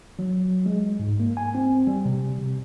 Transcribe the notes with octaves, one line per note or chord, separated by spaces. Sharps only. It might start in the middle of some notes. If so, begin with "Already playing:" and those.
F#3
G#3
G#2
A#3
G#5
C4
G3
C3
C3